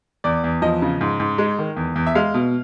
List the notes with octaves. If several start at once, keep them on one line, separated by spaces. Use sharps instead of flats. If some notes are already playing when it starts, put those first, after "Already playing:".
E2 D5
E2
F3 D#5
C#3
G#2
G#2
G#3
D#3
E2
E2
E5
G#3 F5
B2